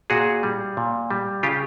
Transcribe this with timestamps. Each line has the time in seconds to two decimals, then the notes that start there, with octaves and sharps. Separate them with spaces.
0.10 A#2 F#4 G#4
0.43 G3
0.77 A#2
1.11 G3
1.43 C#3 F4 G4